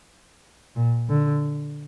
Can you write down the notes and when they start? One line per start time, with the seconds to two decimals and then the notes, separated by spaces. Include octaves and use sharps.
0.76 A#2
1.09 D3